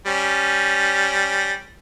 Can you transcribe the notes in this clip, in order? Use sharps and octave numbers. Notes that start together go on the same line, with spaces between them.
G3 C#4